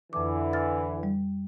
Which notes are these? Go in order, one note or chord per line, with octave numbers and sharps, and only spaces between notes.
F2 D3 E3 D6
F6 A6
G3